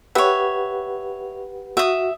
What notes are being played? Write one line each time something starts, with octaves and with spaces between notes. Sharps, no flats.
G4 B4 C#5 E5 F#5
F#4 E5 D#6